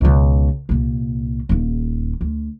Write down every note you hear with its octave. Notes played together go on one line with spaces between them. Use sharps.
C#2 B2
C2 A#2
D#1 D#2
D2